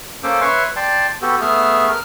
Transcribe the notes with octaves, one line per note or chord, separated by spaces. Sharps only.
A#3 C#4 A4 C5 D6
B4 C#5 E5 C6 C#6
D5 G5 A5 C6
B3 F#4 G4 A4
A3 B3 G#4 E5 F6
A#4 F6